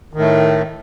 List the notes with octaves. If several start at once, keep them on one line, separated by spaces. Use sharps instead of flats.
A2 D#3 A3